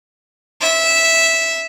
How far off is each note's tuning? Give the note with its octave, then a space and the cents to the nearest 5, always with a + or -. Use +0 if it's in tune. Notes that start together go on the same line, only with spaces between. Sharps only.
E5 -10